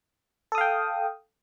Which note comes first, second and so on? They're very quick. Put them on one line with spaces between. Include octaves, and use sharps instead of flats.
A4 D#6 F5 G5